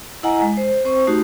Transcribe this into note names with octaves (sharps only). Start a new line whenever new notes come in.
E4 D#5 F#5 G#5 A#5
G#3
C5
C4 C5 C#6
A3 D#4 F#4 G4